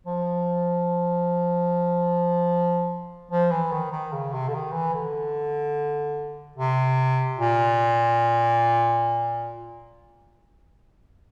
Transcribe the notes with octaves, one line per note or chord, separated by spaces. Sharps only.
F3
F3
E3
D#3
D#3
C#3
C3
D3
D#3
E3
D3
C3
A#2